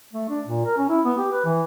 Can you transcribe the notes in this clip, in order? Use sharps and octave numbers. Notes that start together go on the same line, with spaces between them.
A3
D4
A#2
A#4
C#4
E4
B3
G4
B4
E3